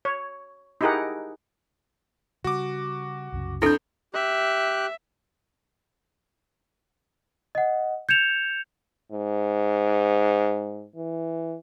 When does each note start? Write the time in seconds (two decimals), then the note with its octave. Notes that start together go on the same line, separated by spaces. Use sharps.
0.05 C#5
0.81 D#4 E4 G4 G#4 A#4 F#5
2.44 C#3 G3 F#4 D6
3.32 C2 F#2 C#3
3.62 F2 D4 E4 A4 G6
4.14 G4 E5 F#6
7.55 D#5 F#5
8.09 G6 G#6 C#7 E7 F7
9.11 G#2
10.95 E3